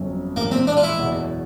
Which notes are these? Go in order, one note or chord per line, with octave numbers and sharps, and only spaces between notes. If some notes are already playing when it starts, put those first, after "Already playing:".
Already playing: G1 F2 C#3 F#3
A#1 A2 E3 G#3 A#3
C4
D4
F4
E4
F#1 E2 B2